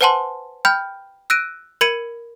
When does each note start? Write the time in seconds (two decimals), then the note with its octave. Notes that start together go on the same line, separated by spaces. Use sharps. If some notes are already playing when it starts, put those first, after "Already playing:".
0.01 B4 C5 F#5 G#5 A5 C6
0.65 G5 B5 F6 G6
1.30 E6 F#6 A#6 D7 D#7
1.81 A#4 B5 G#6 C#7 D#7